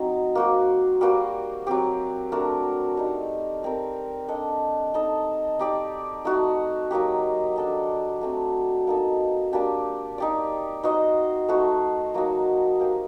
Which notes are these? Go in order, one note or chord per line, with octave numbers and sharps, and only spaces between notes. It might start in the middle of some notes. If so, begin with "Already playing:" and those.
Already playing: F#3 C4 D#4
A#3 F#4 C5
G3 A#3 F#4 C5
F#3 C4 G4
A3 D4 F#4 A#4
G3 C4 D#4
G3 C4 G4 A#4
D4 A4 D#5
D#4 A4 D#5
D#4 G4 D5
A3 D#4 F#4
F#3 A#3 D#4 G4
D4 A4 D#5
F#3 A3 C4
A#3 D#4 A4
G3 A#3 D4 G4
D#4 G4 D5
D#4 F#4 C5 D#5
A3 D#4 F#4 C5
F#3 A#3 D#4 F#4
A#3 D#4 G4 C5